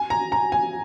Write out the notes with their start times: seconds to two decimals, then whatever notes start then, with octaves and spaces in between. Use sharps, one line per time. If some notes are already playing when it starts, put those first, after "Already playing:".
Already playing: G#5
0.10 A#5
0.32 A#5
0.52 G#5